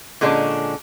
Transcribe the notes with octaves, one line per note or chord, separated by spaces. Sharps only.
A#2 D3 G#3 C#4 D4